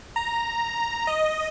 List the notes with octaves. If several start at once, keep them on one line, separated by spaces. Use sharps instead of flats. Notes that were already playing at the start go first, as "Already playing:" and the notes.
A#5
D#5